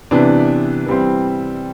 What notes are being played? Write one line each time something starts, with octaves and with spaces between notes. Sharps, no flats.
C3 E3 B3 D4
E3 G3 C4